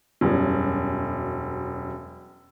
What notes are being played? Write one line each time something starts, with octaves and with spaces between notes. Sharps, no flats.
E1 F#2 G3 C#4